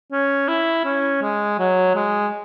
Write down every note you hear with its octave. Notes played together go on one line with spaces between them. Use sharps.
C#4
E4
C#4
G#3
F#3
G#3